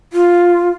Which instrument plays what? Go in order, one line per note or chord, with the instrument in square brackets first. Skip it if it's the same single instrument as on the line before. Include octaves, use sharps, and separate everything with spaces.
[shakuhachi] F4